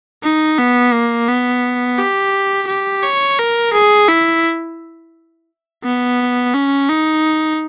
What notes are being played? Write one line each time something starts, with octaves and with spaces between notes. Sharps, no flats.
D#4
B3
A#3
B3
G4
G4
C#5
A#4
G#4
E4
B3
C#4
D#4